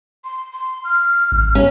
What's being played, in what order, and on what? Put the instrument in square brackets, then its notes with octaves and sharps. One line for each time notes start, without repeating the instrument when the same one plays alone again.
[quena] C6
C6
F6
[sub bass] G#1
[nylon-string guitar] C#4